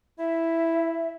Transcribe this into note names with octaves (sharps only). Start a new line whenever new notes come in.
E4 E5